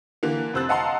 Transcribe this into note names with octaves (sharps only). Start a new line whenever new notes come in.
D3 E3 A#3
F2 C3 C5 E6 F#6 A6
D#5 F5 F#5 A5 A#5 C6